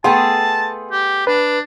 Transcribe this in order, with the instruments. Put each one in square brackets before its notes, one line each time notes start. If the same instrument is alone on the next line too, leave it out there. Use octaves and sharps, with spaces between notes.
[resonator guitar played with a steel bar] A3 B3 G#4 [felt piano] G5 C6 [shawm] A5
[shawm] G4
[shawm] D4 [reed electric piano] B4